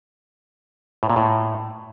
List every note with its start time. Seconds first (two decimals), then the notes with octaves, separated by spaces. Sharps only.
1.03 A2
1.10 A#2
1.16 A2